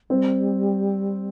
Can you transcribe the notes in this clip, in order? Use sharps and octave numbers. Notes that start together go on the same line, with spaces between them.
G3 C4